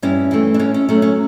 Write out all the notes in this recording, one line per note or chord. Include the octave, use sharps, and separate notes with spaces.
G2 C#4 E4
E3 A3
D4
A2 C#4
C#4
F#3 A3 C#4
C#4